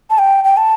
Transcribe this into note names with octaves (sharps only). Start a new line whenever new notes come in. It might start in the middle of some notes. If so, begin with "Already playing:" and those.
A5
G5
G5
A5